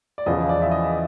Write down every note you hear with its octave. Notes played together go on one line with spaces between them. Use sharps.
D5
E2 C#3 F3 D#5
D5
E5
D#5